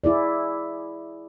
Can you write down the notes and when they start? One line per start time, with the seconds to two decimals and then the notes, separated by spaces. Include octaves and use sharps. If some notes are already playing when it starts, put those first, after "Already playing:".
0.04 E4 G#4 D5